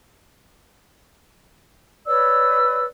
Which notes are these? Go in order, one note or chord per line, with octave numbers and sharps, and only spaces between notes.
B4 C#5 D5 E6